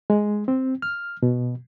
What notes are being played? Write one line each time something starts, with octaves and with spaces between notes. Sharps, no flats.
G#3
C4
F6
B2